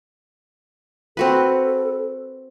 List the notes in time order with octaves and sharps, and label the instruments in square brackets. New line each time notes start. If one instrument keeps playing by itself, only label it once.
[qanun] C4 F#4 B4 [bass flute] A4